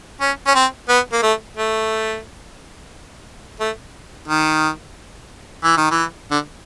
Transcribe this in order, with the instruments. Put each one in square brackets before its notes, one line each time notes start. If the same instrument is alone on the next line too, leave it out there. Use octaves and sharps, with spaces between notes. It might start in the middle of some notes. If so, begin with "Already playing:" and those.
[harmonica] C#4
C#4
C4
B3
A#3
A3
A3
A3
D#3
E3
D#3
E3
D3